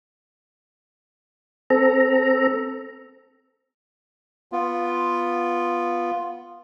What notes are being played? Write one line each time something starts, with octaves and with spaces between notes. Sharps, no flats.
C4 A4 A#5
B3 F4